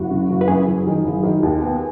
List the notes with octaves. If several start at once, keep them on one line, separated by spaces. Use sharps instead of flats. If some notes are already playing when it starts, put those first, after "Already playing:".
Already playing: F#1 F#4
C#3
F#1
B4
F#2 G#4
F#1
D#3
F#1
D#3
D#2
B3